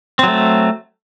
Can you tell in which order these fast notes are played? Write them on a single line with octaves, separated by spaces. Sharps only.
C4 F#3 A3